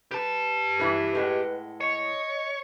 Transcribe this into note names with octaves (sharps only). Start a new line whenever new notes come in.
G4 B4 A5
E3 E4 B4
A2 G#3 B4 F#5
C#5 D#5